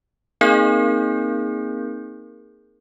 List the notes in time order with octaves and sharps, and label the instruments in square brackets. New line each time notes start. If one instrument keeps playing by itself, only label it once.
[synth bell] A#3 C4 D#4 G#4 A#4 G6